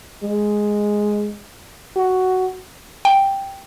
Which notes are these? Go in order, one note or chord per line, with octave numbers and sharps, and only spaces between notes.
G#3
F#4
G5